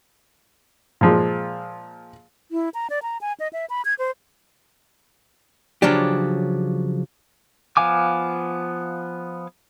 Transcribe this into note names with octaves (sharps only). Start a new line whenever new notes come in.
A#2 F3 G#3
E4
A#5
D5
A#5
G#5
D#5
E5
B5
G#6
C5
C#3 F3 F#3 D4 G4
F3 B3 F5 G#5 D6